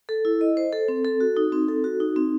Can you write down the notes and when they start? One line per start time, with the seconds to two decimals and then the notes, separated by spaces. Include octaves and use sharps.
0.09 A4
0.25 E4
0.41 D#5
0.57 C5
0.73 A4
0.88 C4
1.05 A4
1.20 F#4
1.37 D#4
1.52 C4
1.68 A4
1.84 F#4
2.00 D#4
2.16 C4